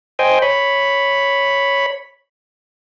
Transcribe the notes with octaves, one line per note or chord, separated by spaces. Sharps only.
C5 D#5 G5 G#5
C#5 B5